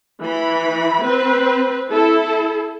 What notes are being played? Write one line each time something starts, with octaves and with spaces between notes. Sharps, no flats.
E3 B5
C4 B4
E4 A4